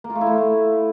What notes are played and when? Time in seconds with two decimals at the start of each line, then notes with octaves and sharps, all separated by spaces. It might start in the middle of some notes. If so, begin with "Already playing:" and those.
0.04 A#3
0.10 F4
0.15 A3
0.21 E4
0.27 A3